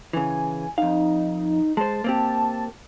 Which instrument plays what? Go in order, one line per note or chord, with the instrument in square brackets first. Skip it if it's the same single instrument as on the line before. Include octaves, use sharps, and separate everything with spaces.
[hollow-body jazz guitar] C#3 E3 [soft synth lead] G#5
[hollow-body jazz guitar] F2 F5 [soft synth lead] D#4
[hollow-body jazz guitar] G#3 C5 [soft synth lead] A5
[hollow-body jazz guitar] A#3 C4 G4